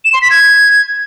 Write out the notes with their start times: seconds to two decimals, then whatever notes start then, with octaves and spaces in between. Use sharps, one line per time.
0.05 E7
0.13 C6
0.22 B6
0.31 G#6